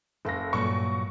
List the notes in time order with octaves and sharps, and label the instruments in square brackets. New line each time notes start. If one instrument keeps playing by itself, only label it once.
[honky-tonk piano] F#1 A#6 [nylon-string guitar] A4 F5
[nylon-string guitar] G2 A#2 F#3 [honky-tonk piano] C#6